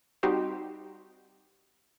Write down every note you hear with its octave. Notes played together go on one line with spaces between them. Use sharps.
G3 C4 D#4 F#4 G4 C5